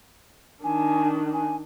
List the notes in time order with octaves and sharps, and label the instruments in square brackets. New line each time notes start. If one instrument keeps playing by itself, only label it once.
[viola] D#3 D4 [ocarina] G#5
[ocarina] G#5